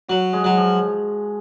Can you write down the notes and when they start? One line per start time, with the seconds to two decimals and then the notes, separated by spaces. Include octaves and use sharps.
0.08 F#3 F#4
0.33 G#3
0.44 F#3
0.57 F3